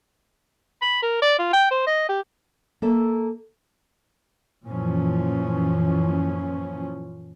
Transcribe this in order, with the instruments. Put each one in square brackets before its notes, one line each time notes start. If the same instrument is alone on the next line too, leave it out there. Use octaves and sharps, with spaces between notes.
[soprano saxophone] B5
A#4
D5
F4
G5
C5
D#5
G4
[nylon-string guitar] A#3 A4 E5
[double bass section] F#2 A#2 E3 F3 C#4